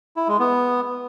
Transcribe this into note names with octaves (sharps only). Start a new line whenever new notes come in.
E4
G#3
B3